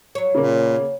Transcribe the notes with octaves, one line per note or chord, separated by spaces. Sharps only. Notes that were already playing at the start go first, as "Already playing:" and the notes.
F#3 C#5
A#2 C#3 A#3